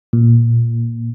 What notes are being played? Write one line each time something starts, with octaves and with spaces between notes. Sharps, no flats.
A#2